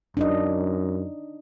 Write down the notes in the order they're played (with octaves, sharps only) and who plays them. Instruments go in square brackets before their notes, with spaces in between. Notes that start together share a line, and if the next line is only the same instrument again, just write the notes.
[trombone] F#2 [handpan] D4 D#4 D#5